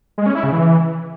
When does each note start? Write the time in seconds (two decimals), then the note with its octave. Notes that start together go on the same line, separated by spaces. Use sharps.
0.18 G#3
0.26 C#4
0.35 E4
0.44 C#3
0.52 E3